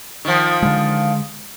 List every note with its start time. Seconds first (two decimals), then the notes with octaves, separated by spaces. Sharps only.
0.25 D#3 F3
0.63 D3 G#3